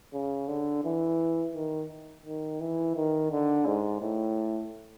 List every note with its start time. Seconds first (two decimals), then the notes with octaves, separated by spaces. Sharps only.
0.13 C#3
0.48 D3
0.84 E3
1.55 D#3
2.25 D#3
2.60 E3
2.96 D#3
3.31 D3
3.66 G#2
4.01 A2